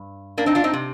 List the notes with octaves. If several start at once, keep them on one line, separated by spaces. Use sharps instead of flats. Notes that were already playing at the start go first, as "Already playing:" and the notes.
Already playing: G2
A#3 D4
C4 D#4
D4 F4
C4 D#4
C3